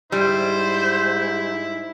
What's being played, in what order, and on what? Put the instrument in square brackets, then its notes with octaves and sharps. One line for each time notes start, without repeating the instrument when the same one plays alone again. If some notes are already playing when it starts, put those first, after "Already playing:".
[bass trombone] G#2 [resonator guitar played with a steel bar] G3 [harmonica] E4 [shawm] C5